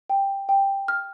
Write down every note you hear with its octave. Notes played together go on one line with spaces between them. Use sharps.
G5
G5
F6